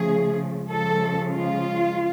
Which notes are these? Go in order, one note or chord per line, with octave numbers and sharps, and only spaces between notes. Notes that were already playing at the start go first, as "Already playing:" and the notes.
Already playing: C#3 F3 A3 G#4
C#3 F3 G#3 A4
F4